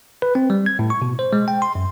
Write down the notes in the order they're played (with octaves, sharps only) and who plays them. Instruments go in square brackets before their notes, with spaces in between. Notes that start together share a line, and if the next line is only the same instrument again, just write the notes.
[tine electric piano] B4
C4
G3
G#6
A2
C#6
B2
C5
G#3
G5
C6
F#2